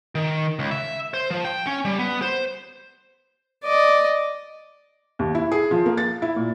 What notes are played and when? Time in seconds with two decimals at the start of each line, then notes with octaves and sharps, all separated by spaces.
0.15 D#3
0.59 C#2
0.71 E5
1.14 C5
1.31 F3
1.45 G5
1.67 C#4
1.85 G3
1.99 B3
2.22 C5
3.64 D5 D#5
5.19 D#2
5.35 E4
5.51 G#4
5.71 F3
5.86 A#3
5.97 A6
6.22 E4
6.36 A#2